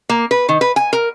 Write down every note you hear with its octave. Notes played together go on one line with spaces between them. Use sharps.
A#3
B4
D#3
B4
G#5
A#4